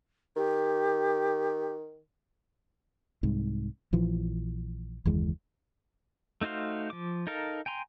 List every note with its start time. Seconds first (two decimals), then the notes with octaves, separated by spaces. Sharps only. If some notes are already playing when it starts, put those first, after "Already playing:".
0.36 D#3 G4
3.23 C2 G#2
3.93 A#1 E3 F3
5.05 F#1 D#2 E3 G#3
6.41 A3 D#4 F#4 C5 F5
6.90 F3 D6
7.27 D#4 A4 A#4 F5
7.66 G5 G#5 A#5 C6